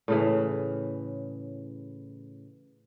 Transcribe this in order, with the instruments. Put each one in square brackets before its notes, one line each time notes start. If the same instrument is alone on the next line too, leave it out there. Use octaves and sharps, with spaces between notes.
[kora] A2 C#3 E3